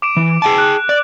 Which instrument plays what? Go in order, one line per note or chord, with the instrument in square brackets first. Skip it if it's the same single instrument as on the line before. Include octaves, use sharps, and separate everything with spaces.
[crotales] D6 D7 E7
[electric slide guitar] E3
G#4 G5 A5
[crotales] F#6
[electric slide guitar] D5